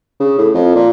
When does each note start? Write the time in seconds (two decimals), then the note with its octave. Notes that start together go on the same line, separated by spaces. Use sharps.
0.20 C#3
0.38 A2
0.55 F2
0.75 A#2